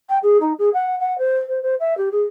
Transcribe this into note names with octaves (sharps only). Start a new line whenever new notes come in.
G5
G#4
D#4
G#4
F#5
F#5
C5
C5
C5
E5
G4
G#4